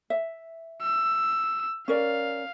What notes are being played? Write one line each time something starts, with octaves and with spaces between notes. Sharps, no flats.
E5
E6
C#4 A#4 D5 F5